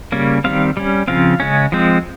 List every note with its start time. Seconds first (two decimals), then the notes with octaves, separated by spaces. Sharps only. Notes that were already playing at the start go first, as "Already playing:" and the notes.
0.12 C#3 G3 A#3 C#4
0.44 D#3 G3 C4 F5
0.77 G3 C#4
1.08 C#3 F3 C4 F5
1.40 C#3 G#3 C#4
1.72 F3 G#3 C4